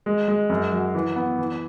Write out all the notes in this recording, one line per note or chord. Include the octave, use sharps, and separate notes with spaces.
G#3
G#3
F#2
F#3
E3
B3
E3